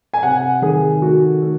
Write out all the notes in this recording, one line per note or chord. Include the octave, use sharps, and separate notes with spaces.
G#5
C3 F#5
D#3 G#4
A3 F#4
A3